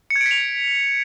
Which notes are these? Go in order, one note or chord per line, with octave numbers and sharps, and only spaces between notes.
C#7
G#6
D7
B6
F7